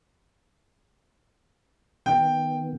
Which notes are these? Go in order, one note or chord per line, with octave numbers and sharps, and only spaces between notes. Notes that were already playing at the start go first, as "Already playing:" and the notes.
D#3 B3 G5